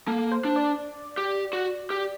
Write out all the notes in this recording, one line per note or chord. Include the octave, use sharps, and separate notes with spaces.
A#3 A4
C5
D4
D5
G4
F#4
G4